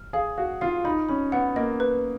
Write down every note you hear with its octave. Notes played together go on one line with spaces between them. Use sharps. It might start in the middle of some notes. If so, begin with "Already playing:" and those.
Already playing: F6
G#4 F5
F#4 F5
F4 F5
D#4 B5
C#4 B5
B3 F#5
A#3 D#5
B4